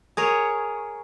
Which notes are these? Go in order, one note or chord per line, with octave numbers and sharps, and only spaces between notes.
G#4 A#4 C#5